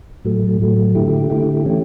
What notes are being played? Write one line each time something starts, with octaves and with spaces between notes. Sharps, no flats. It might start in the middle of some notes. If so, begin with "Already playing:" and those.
A2 F#3 A3
A2 F#3 A3
D3 A3 E4 G4
D3 A3 E4 G4
E3 A3 C#4 G4